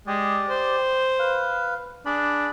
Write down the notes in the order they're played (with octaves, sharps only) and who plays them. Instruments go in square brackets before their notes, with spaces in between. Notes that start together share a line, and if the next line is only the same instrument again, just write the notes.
[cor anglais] G#3 [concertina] G4 D5
[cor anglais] C5
[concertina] B4 F5
[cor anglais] D4 [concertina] G#4 B5